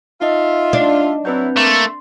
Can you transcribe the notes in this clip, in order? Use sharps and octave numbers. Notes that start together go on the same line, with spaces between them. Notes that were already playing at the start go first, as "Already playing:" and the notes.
D#4 F4 D#5 E5
D4
F#3 C4 E4 B4 G6
A3 A#3 C6